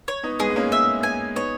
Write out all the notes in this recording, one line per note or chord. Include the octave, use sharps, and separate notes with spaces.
C#5
B3 D#4
G#3 B3 G#4
B3
A#3 C#4
E5
G#5
B3 D#4 C#5